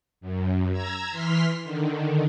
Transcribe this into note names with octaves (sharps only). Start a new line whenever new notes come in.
F#2
A#5 E6 G#6
E3 C6 F6 B6
D3 D#3